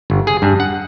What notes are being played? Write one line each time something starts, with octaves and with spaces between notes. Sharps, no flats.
G1
G#4
G2
F#5